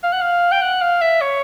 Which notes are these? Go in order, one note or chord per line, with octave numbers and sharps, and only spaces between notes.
F5
F#5
F5
G5
F#5
F5
E5
C#5